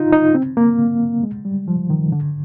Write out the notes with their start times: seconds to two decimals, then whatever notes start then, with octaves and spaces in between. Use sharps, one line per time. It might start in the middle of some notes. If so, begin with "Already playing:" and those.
Already playing: D#4 F4
0.13 D#4
0.35 C4
0.57 A#3
1.23 G#3
1.45 G3
1.68 F3
1.90 D#3
2.12 D3